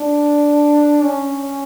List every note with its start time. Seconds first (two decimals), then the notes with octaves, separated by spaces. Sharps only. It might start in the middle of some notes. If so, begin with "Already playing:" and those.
Already playing: D4
1.03 C#4